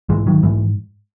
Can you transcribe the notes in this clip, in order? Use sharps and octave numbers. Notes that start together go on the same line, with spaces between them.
G#2 E3 G#3
D#3 F#3
G#2 E3